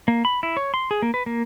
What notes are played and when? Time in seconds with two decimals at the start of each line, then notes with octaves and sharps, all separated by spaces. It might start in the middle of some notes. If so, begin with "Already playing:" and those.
0.08 A#3
0.25 B5
0.43 E4
0.57 C#5
0.74 C6
0.91 G#4
1.02 A#3
1.14 B4
1.26 A#3